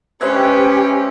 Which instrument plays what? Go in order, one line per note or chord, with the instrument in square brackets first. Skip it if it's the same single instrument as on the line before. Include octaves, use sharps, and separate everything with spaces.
[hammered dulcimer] G#3 B4 E5 [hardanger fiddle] C#4 [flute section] G4 [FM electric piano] C5 G#6